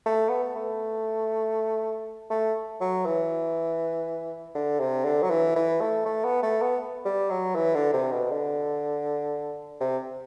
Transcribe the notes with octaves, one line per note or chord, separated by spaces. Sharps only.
A3
B3
A3
A3
F#3
E3
D3
C3
D3
F#3
E3
E3
A3
A3
B3
A3
B3
G3
F#3
E3
D3
C3
B2
D3
C3